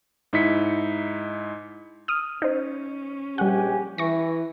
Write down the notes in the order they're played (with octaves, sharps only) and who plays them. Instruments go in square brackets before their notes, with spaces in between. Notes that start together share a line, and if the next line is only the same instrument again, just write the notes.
[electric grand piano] G#2 D#4 E4 B6 C#7
[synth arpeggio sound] D#6 F6
[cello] C#4 [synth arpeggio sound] D#4 C5
[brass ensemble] A#1 G4 G#5 [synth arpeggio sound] G3 F#5
[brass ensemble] E3 [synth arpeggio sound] C#6 A#6